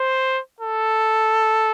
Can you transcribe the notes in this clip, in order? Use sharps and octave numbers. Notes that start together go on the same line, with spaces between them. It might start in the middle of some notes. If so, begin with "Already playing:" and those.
Already playing: C5
A4